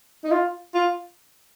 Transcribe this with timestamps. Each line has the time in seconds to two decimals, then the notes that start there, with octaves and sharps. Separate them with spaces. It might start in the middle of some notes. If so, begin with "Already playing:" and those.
0.24 D#4
0.31 F4
0.74 F4